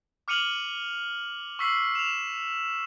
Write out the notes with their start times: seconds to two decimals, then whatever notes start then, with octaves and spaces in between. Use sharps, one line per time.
0.28 D6 F6 C#7 D#7 F7 F#7
1.59 C#6 E6 B6 C7 F#7
1.95 E7 F7